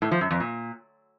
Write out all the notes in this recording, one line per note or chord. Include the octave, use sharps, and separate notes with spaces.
A2
F3
F#2
F2
A#2